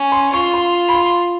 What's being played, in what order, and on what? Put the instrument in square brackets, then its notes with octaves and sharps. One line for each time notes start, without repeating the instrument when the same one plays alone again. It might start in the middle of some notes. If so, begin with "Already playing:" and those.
Already playing: [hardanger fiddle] C#4
[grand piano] C6
[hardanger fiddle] F4 [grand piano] C#6
[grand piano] C6
B5
C6